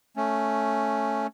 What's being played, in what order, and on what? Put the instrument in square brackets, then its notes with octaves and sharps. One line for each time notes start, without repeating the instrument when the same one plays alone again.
[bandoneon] A3 C#4